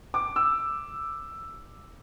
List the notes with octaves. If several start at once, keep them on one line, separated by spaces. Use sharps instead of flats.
D6
E6